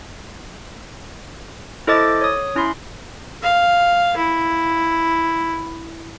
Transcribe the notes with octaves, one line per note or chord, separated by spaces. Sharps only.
E4 A4 C5 D#5 D6 A6
C#5 D#6
C#4 E4 B5 C6
F5
E4